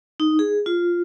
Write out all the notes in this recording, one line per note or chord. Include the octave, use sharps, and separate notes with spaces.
D#4
G#4
F4